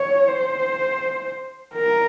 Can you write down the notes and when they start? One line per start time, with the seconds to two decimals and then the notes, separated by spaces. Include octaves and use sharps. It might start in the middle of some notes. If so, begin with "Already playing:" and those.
Already playing: C#5
0.28 C5
1.75 A#4